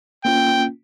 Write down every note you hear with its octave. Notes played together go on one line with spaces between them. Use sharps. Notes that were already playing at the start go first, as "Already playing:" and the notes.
A#3 C#4 F4 G5